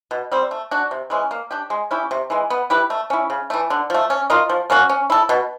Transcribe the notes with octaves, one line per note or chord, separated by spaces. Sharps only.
B2
G3 C4
A3
D4 F#4
C3
E3 G#3 C#4
A#3
D4 G4
G#3
C#4 E4 G4
C3
E3 G#3
B3
E4 G4 B4
A3
C#4 E4
C#3
E3 A3
D3
F3 A3
C#4
F4 A#4 D#5
F3
A#3 C#4 F#4
C#4
E4 A4
B2